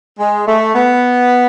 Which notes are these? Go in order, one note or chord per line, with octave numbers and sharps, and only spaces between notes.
G#3
A3
B3